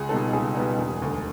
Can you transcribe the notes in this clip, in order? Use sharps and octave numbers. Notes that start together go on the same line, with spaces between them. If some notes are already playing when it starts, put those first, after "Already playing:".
Already playing: C#2 G#4
B2 G3 B3 D#4 A4
C#2 G#4
B2 G3 B3 D#4
E1
D2 D3